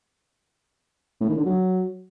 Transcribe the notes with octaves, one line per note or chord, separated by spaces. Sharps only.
A2
D#3
D3
F#3